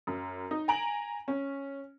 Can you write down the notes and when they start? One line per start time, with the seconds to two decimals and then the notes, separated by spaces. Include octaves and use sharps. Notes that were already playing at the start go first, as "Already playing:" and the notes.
0.07 F#2
0.51 D#4
0.68 G#5 A#5 D7 F#7
1.28 C#4